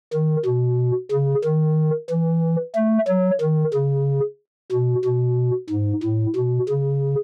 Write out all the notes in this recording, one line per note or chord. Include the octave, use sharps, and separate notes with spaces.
D#3
B2
C#3
D#3
E3
A3
F#3
D#3
C#3
B2
B2
G#2
A2
B2
C#3